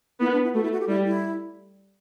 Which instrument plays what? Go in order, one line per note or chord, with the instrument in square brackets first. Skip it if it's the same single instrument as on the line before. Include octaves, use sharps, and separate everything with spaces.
[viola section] B3 [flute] E4
[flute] D4
E4
[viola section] A3 [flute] F#4
[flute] E4
F#4
G4
[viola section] G3 [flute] E4
[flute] E4